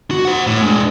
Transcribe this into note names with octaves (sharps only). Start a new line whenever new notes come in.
F#4
C5 F#5
A2
G#3 D4